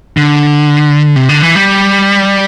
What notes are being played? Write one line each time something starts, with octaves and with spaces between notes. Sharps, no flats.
D3
C3
D3
E3
G3